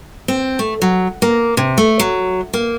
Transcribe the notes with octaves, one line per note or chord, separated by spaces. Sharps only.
C4
A3
F#3
A#3
C3
A3
F#3
A#3